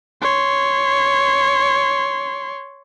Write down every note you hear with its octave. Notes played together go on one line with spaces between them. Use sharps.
C#5 C6